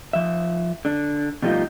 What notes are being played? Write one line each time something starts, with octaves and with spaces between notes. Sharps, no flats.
F3 E5
D3 D4
B2 F3 G3 A3 D#4 F4